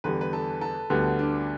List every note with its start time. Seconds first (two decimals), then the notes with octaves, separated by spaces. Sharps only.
0.04 E2 D3 G3 B4
0.21 B4
0.33 A4
0.61 A4
0.90 D2 D3 G3 B3 F#4
1.19 D4